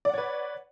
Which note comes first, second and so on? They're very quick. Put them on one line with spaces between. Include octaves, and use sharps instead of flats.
D5 F#5 C#5 B4